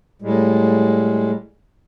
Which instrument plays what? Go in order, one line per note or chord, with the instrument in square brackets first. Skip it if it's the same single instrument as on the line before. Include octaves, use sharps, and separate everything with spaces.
[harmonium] A2 G3 G#3